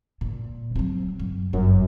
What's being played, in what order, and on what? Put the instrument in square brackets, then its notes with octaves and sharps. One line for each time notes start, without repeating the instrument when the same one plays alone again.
[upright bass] A#2
F#3 C4
F#2
[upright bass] G1 [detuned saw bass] F#2